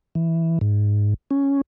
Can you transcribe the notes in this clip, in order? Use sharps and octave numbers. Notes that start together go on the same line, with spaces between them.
E3
G#2
C#4